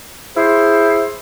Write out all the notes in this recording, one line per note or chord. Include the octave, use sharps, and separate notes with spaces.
E4 G#4 C5